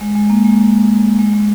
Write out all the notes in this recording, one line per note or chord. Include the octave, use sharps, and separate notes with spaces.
G#3
G#3
A#3
G#3
G#3
G#3